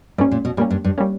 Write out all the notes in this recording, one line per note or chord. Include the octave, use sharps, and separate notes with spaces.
G#2 G3 A#3 C#4
A#2
B2
A#2 G3 A#3 C#4
G2
G2
G3 A#3 C#4